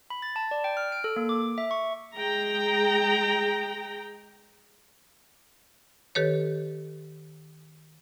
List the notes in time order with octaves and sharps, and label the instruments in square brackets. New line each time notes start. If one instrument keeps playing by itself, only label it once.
[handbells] B5
A6
A5
D5
G5
F6
D7
A4
A#3
D6
E5
C#6
[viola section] G#3 G#4 G5 A#5
[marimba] D#3 G4 A4 B4 C#5